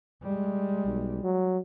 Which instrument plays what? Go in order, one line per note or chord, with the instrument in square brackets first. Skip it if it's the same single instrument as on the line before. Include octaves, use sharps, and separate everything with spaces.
[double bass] G3 G#3
[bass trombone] B1
F#3